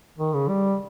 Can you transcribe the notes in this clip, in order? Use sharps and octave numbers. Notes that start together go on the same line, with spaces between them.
D#3
C#3
G3